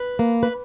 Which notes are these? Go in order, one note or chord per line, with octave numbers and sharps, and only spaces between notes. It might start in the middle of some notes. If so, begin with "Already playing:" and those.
Already playing: B4
A#3
B4